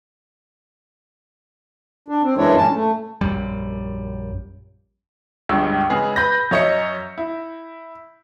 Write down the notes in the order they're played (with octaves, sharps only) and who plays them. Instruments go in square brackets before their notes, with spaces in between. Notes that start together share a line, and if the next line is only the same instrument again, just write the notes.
[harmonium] D4
C4
F#2 E3 G#3 D4 E4 C#5
A#2 C#4 A5
A3
[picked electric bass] A#1 F#2 G3
[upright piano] G1 C#2 G2 G#3 E6
C#3 G#3 G#4 B4
B4 B5 G6 A#6
F#2 C#5 D#5 E5 C#7
E4